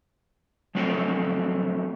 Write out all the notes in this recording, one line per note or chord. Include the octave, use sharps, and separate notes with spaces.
F3 F#3 A3 C4 C#5